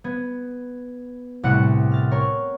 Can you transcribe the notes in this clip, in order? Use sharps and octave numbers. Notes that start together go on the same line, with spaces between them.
B3 G#6
C2 A2 F#5 F#6 C#7
F6 A6
A#4 C#5